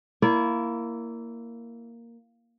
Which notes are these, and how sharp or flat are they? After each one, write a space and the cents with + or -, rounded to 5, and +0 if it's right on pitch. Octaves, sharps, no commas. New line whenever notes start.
A#3 +0 E4 +15 D5 -30